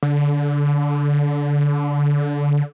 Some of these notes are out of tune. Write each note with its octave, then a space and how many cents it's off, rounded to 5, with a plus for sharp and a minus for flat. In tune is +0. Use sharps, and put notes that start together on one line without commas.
D3 -20